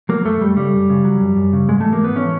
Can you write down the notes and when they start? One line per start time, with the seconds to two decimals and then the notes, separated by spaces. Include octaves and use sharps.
0.09 F#3 A#3
0.25 F#2 A3
0.41 F#2 G3
0.57 C#3 G3
0.73 F#2
0.90 C#3
1.05 F#3
1.20 F#2
1.36 F#2
1.53 C#3
1.69 G#2 G#3
1.80 E3 A3
1.93 A#3
2.01 G#2 B3
2.16 E3 C#4